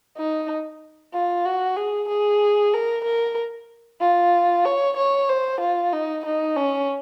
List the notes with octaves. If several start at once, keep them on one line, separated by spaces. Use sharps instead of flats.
D#4
F4
F#4
G#4
G#4
A#4
A#4
F4
C#5
C#5
C5
F4
D#4
D#4
C#4